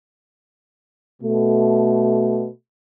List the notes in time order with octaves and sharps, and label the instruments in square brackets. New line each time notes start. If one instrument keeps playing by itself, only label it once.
[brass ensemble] B2 A3